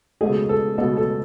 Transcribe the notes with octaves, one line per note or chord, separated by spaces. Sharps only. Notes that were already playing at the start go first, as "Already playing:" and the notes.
C#2 B2 A3 G#4
A4
C#2 B2 A3 A4
A4